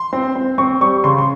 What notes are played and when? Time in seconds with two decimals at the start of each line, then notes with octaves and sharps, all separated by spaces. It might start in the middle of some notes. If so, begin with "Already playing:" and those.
Already playing: C6
0.13 C4
0.36 C4
0.58 C4 C#6
0.80 G3 C#6
1.04 C#3 C6
1.18 C6